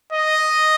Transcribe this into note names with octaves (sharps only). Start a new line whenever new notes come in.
D#5